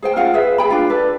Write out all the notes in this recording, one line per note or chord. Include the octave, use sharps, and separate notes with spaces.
G#4 C5 G5
C#4 F4 F5 F#5
G#4 B4 E5
G#4 G5 B5
D4 F4
A4 B4 D5